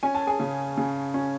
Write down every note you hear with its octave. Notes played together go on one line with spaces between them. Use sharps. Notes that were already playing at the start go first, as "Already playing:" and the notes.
C#4 G#5
A5
G#4 G#5
C#3
C#3
C#4